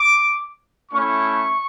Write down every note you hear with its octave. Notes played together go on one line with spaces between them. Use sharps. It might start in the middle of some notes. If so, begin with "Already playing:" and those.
Already playing: D6
A3 C#4 E4 C#6